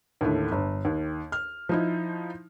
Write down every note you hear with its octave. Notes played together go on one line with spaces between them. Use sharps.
D#2 A2 D3 A3
G1
D#2
F6
F3 D#4 E4